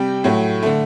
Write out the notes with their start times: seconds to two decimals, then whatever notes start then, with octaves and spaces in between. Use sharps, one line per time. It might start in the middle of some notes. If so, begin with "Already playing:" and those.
Already playing: C3 G3 G5
0.24 A2 F#3 A3
0.63 D3 A3